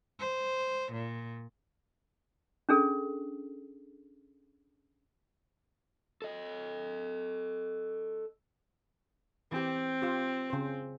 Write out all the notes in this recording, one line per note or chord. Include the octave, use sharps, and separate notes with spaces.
C5
A#2
C#4 D4 G#4 A4
A4 D#5
E3 C4 G4
F4 G4
C#3 C5